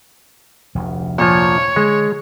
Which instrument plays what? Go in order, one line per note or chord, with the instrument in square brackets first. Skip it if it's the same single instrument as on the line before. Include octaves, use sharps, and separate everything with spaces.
[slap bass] F1 D2
[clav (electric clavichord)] A#2 F3 [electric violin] C#5
[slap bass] D3 [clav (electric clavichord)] G#3